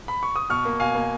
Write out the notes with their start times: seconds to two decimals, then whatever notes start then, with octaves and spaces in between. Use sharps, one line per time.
0.08 B5
0.23 C#6
0.36 D#6
0.49 B2 C#6 F6
0.65 A#3
0.80 B2 F5 G#5
0.95 A#3